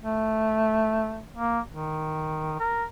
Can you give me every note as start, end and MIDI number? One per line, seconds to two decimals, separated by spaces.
0.02 1.24 57
1.36 1.60 58
1.69 2.56 51
2.60 2.84 70